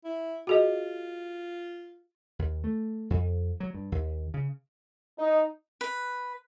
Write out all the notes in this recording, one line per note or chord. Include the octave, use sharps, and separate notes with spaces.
E4
F4 F#4 G#4 D#5
D#2
A3
F2
F#3
G2
D#2
C#3
D#4
B4